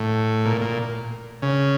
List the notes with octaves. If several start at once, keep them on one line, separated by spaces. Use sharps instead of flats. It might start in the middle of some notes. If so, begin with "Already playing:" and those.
Already playing: A2
A#2
A#2
C#3